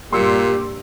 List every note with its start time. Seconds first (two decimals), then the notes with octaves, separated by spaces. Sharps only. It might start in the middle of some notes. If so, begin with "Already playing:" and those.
0.13 G2 A#2 G3 A#3 G4 C6 E6 C#7